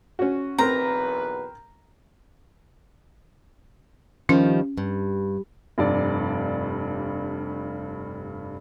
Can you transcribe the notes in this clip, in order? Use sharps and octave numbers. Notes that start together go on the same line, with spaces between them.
C#4 F#4
B1 E2 C4 A#4 B4 A#5
G2 D#3 F3 C#4
G2
F1 G2 D5